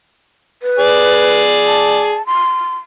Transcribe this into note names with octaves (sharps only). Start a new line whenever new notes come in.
B4
G#4 D5
A5
C6